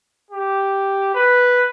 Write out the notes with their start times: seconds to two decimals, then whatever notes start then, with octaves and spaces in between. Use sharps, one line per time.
0.31 G4
1.15 B4